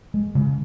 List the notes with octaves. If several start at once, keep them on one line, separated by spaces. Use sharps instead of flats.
G#3
C#3